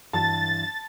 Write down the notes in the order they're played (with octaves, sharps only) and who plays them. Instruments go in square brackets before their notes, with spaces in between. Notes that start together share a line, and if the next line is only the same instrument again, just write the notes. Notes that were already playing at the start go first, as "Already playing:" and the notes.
[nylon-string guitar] G2 E3 F#4 [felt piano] A5 [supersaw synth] A6